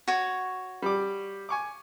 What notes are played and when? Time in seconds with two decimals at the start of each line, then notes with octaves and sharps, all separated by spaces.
0.08 F#4 C#5
0.82 G3 D6
1.49 G#5 C#6 D6